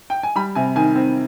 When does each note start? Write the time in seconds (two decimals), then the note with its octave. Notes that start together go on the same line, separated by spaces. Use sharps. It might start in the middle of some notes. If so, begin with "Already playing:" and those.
0.10 G5
0.23 G#5
0.36 G3 B5
0.55 C3 G#5
0.76 D#3 G#5
0.95 C4